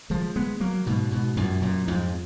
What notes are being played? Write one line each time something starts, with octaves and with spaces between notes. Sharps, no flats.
F3 G#3
G#3 B3
F#3 A#3
G#2 B2
G#2 B2
F#2 A#2
F#2 A#2
F2 G#2